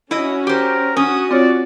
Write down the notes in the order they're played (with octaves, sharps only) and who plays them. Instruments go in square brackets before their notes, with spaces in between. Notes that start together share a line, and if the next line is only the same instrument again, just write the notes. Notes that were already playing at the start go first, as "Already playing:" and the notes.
[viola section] C#4 F#4 [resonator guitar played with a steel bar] E4 D#5
[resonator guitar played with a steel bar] G4 C5 [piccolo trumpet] A#4
[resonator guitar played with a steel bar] C#4 [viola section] F#4 [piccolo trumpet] D#6
[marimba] C4 F4 C#5 [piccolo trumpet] D5